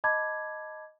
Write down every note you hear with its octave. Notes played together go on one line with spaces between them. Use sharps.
D#5 A5 B5 D6 G#6